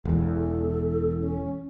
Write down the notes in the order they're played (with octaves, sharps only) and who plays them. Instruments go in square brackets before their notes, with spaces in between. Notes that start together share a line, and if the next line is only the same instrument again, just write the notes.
[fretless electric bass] E1 E2 [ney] A4
[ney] C#4